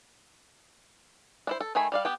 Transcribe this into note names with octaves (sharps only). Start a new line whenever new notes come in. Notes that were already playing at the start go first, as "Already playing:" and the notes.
D4 E4 C5
A4
D#3 A3 G#4 G#5 B5
G3 D5 F5
B3 G4 G5